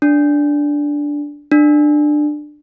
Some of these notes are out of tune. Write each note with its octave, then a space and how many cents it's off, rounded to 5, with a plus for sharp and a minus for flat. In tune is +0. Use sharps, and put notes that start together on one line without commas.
D4 -5
D4 +20